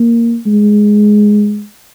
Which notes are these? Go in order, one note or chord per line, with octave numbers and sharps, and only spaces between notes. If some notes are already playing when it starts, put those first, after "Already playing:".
Already playing: A#3
G#3